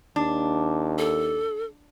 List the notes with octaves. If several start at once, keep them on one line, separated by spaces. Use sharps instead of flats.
D#2 D4
A4